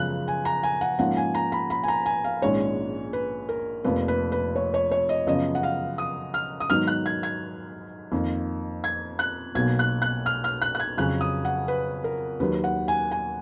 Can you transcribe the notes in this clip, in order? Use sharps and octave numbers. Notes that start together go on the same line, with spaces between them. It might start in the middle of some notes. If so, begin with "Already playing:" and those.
Already playing: F#2 C#3 F3 G#3 B3 F#6
G#5
A#5
G#5
F#5
G#2 F3 A#3 C#4 F#5
G#5
A#5
B5
B5
G#5
A#5
G#5
F5
A#1 G#2 D#3 G#3 C#4 C#5
B4
A#4
F1 F2 F3 A#3 B4
B4
B4
C#5
C#5
C#5
D#5
F#2 C#3 F3 B3 D#5
F#5
F5
D#6
F6
D#6
G#2 D#3 F#3 B3 F6
F#6
G#6
G#6
F2 D#3 A#3
G#6
F#6
B1 B2 A#3 G#6
F#6
F#6
F6
F6
F#6
F#6
G#6
F2 C#3 F#3 C#4 F#6
D#6
F#5
B4
A#4
D#2 D#3 F#3 B4
F#5
G#5
G#5